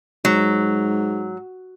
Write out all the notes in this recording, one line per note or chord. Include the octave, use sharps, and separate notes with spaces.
G#2 F#3